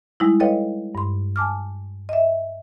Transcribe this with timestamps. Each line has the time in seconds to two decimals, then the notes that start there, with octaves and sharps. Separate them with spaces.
0.20 G3 G#3 D#4 E4
0.40 A4 B4 C#5 D#5 F5 G5
0.95 G2 C6
1.36 G#5 A5 D6 F6
2.09 D#5 E5